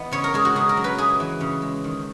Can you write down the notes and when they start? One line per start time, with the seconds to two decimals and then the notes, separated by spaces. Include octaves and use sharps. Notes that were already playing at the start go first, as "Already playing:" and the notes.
Already playing: E3 B3 D#5
0.12 C#3 C#5
0.24 A#4
0.34 G#3 G#4
0.45 F#4
0.55 C#3 G#4
0.69 A#4
0.77 F#3
0.84 B4
0.97 E4 G#4
1.20 E3
1.41 C#3
1.62 G#3
1.84 D#3